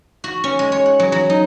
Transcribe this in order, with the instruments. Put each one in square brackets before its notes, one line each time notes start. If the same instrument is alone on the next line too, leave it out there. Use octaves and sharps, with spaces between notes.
[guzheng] F#4
C#4
G#3
C#5
F#5
F#3
F#3
D#4